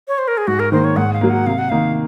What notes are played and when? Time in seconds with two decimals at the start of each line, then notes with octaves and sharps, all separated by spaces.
0.08 C#5
0.18 C5
0.28 A#4
0.38 G#4
0.47 G#2 F#4
0.60 A#4
0.72 D#3 A#3 C5
0.84 C#5
0.96 G#2 F#5
1.13 F5
1.21 F#3 A#3
1.30 F#5
1.46 C3 F5
1.58 F#5
1.69 D#3 A#3 D#4 F5